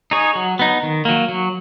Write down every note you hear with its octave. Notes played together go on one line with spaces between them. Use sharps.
D#4 G#4 C#5
F#3
B3 D#4
D#3
F#3 A#3
F#3